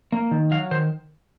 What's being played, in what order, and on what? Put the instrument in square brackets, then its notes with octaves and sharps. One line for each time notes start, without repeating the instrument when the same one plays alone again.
[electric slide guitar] A#3
D#3
F#3 F5
D#3 C5